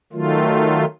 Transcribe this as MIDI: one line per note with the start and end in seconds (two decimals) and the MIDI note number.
0.13 0.85 51
0.13 0.85 54
0.13 0.85 57
0.13 0.85 65